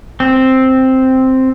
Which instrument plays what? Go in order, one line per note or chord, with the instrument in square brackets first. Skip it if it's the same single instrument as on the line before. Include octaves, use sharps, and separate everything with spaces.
[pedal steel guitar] C4